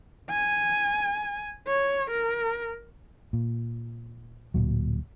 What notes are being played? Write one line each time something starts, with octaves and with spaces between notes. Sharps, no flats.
G#5
C#5
A#4
A#2
D1 G1 A#2 F#3